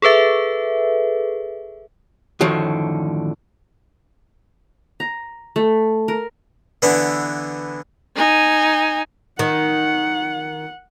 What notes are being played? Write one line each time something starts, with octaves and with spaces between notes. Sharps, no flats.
G#4 A4 B4 E5
F#2 A2 D3 D#3 F3 F#3
A#5
A3
A#4
D3 E3 B3 D4 E4
D#4 G#5
D#3 F#5